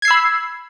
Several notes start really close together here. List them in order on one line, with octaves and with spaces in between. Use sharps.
G#6 C7 E6 B5